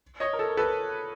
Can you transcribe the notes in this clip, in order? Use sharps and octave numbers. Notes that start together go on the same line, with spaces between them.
C#5 D#5
A#4
A4
A#4
A4 B4